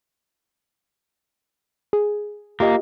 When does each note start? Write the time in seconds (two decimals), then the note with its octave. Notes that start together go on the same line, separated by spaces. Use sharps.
1.93 G#4
2.60 A#3 F4 G4 D#5